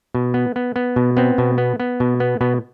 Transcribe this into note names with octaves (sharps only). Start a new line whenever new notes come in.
B2
B3
B3
B3
B2
B3 C4
B2
B3
B3
B2
B3
B2 B3